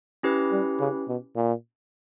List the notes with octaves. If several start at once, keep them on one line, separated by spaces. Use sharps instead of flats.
C#4 E4 G4 B4
G3
C#3
B2
A#2